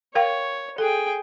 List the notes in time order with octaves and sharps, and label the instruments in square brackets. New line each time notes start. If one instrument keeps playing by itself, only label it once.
[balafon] A#4 F5 G5 [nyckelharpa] C#5
[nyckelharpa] G#4 G5 [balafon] A4